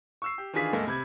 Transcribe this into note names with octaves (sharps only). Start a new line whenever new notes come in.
C#6 E6 C7
G4
D#3 E3 D4 F4 G#4 B6
E2 A2 G#3 A#3 A4
C3 B5 G#6